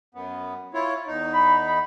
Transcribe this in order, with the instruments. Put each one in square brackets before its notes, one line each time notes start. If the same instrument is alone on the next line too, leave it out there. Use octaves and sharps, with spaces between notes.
[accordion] F#2 B3
E4 F4 C#5
E2 D#4
[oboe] B5
B5